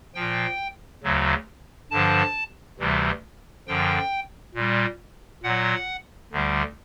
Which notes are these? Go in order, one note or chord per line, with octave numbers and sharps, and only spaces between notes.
A#2 F3 G5
D2 C#3 F#3
G2 D3 F3 A5
D2 C3 E3 G3
F#2 D3 F3 G5
A#2 G3
A#2 F#3 F#5
D2 D3 G3